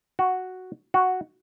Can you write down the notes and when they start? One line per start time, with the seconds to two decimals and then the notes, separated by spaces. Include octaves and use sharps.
0.19 F#4
0.94 F#4